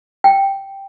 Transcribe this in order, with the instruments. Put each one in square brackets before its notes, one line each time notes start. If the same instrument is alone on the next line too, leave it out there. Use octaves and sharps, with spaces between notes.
[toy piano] G5